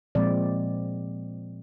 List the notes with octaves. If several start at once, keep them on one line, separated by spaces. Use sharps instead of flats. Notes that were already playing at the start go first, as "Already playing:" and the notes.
A#2 F3 G#3 C4 D5